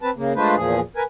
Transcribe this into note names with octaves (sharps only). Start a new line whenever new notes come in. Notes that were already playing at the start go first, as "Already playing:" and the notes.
C4 B4 A5
C#3 A#3
G#3 A3 D4 F4 B4 C5
E2 A#2 F3 G#4
A#4 B4 G#5